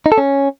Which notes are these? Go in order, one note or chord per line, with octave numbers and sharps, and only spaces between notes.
D#4
A4
C#4